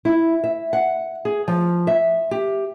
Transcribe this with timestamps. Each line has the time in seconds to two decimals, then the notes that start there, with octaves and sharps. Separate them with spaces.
0.05 E4
0.44 E5
0.73 F#5
1.25 G#4
1.48 F3
1.87 E5
2.31 G4